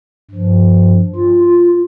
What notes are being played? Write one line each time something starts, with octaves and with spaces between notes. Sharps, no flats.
G2 F3
F4
F4